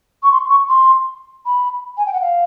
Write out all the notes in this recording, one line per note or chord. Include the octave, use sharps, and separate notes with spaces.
C#6
C6
C#6
C6
B5
G#5
G5
F#5
F5